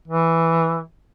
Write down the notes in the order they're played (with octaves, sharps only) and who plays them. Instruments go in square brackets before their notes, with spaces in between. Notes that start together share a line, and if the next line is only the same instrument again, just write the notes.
[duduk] E3